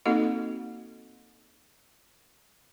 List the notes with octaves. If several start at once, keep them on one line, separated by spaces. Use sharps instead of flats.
A#3 C4 D#4 F#4 A4 D#5